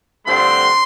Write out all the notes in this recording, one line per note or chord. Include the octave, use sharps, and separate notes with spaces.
G2 D3 F3 A3 C4 C6